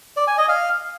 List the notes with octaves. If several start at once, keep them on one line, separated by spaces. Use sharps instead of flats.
D5
G#5
D#5
F5